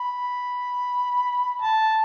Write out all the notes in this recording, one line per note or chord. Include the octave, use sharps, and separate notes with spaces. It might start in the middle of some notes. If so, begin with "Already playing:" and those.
Already playing: B5
A5